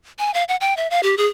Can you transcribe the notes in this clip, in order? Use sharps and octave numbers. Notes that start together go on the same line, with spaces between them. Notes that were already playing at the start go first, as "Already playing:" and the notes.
G#5
F5
F#5
G5
E5
F5
G4
G#4